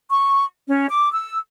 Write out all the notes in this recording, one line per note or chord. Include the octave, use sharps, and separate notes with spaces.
C#6
C#4
D6
E6